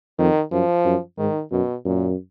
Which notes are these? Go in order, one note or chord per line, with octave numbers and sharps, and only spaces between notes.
F2 D#3
F#2 F3
F#2
G#2 D#3
F#2 B2
F#2 A#2